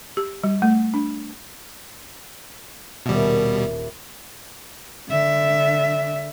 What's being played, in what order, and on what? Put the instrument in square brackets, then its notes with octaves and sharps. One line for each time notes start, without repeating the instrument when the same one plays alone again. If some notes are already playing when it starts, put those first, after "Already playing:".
[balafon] G4
G3
A3
D4
[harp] D#1 E5 [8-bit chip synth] B2 G3
[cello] D3 E5